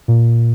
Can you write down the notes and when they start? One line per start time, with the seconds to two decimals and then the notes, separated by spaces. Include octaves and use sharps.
0.08 A#2